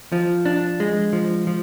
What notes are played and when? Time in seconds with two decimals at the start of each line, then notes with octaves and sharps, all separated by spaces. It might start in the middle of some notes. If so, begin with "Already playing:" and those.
0.12 F3
0.46 D4
0.80 G#3
1.13 F3
1.47 F3